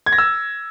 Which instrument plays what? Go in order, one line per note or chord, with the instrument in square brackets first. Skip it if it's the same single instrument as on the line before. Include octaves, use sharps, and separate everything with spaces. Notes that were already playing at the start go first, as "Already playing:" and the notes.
[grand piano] G#6
A#6
E6